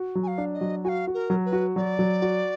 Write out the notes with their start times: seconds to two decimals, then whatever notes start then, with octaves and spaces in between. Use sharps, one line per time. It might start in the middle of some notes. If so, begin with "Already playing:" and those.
Already playing: F#4
0.15 F#3
0.23 G#5
0.28 F5
0.38 D4
0.54 D#5
0.61 F#3
0.84 F#4 F5 G#5
1.07 F#4
1.14 A#4
1.30 F#3
1.46 B4
1.53 F#4
1.76 F#3 D5
1.99 F#3
2.22 F#4